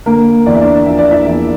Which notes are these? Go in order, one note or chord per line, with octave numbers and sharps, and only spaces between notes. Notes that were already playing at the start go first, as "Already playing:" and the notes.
D3 A#3 A#4
E2 D5
E5
D4 D5
F3 E5
D5
E4 E5
E2 E5